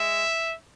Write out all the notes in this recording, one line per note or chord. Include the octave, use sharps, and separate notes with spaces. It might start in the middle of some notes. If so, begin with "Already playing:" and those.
Already playing: G#3 E5